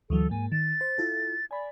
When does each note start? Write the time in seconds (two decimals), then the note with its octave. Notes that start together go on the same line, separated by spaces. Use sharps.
0.10 D2 E3 F#3 A4
0.31 G#2 A#3 G#5
0.52 D#3 A6
0.81 C5
0.98 E4 F4 A4
1.51 D5 G#5 B5